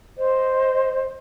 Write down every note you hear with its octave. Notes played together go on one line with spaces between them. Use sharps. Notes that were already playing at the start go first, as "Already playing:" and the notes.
C5 D#5